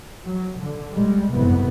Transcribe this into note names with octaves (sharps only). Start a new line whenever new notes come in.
F#3
D3
A#1 G3 G#3
F#1 C2 F2 G#2 C3 B3